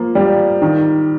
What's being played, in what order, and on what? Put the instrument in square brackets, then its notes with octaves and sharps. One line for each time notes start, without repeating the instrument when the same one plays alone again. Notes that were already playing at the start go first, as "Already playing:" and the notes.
Already playing: [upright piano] F3 A#3
G3
D#3